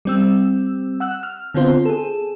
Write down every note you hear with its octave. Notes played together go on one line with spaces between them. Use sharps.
G3 C4 E6
F#5 E6 F#6
F6
D3 B3 C4 F4 C5
G#4 A4